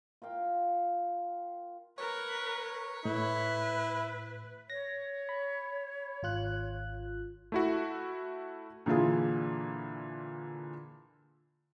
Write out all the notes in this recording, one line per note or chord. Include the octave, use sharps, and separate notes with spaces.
F4 A#4 F5 G5
A#4 B4 C#5
A2 E4 B4
C#5 A#6
B5
G#1 F4 F#6
A3 E4 F#4
A#2 D3 E3 F4 G#4